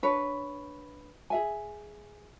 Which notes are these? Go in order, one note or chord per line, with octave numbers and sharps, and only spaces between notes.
D4 B4 C#5
G#4 E5 G#5